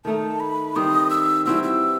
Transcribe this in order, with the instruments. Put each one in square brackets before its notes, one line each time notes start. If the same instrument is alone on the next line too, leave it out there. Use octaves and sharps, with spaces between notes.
[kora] D#3 A3 D#4 [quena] A5
[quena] B5
[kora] D#3 G3 C4 [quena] D#6
[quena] E6
[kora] E3 G3 C4 F#4 [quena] E6
[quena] E6